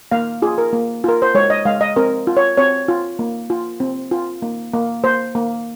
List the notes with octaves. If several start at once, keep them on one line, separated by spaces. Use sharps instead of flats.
A#3 F5
F4 G#4
A#4
A#3
F4 A#4
C5
G#3 C#5
D#5
G#3 F5
D#5
C4 A#4
F4
C#5
C4 C#5
F4
A#3
F4
C4
F4
A#3
A#3
A#3 C5
A#3